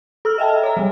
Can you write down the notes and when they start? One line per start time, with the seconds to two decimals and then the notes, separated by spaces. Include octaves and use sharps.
0.25 A4 E6 F6
0.38 D#5 E5 G5 A5
0.63 C#5 A#5
0.77 F#3 G3